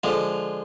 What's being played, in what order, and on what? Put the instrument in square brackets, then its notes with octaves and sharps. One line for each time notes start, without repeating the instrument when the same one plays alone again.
[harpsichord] D3 F3 G#3